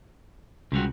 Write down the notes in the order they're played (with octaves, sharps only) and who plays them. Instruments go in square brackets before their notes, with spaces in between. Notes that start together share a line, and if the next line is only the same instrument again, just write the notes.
[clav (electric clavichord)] C#2 [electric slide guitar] C3 G3 F#4